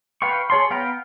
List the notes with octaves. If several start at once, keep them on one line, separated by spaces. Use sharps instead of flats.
B4 F5 G5 C#6
G#4 C#5 A5 C6
B3 F5 G5 A#5 B5